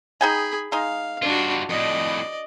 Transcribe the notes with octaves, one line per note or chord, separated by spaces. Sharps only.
D#4 G#4 G5 G#5 B5
G#3 D#4 F5
G2 D4 F4 F#4
F2 A2 D5 D#5